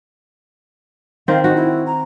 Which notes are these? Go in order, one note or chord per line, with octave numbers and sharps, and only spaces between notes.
D#3 C4 F5
D#4 F#4
E4
A#5